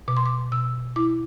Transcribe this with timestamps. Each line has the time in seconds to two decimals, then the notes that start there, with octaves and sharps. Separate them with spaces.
0.08 B2 D6
0.17 C6
0.26 D6
0.51 B2 E6
0.96 E4 D6